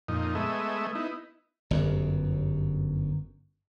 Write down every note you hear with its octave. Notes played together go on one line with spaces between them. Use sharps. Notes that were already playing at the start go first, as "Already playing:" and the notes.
F2 A#2 D#4
G#3 A3 B3 D#5 E5
B3 D#4 E4
G1 F#2